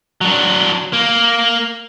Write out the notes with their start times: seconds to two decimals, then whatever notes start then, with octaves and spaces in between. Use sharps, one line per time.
0.21 F#3 D4
0.93 A#3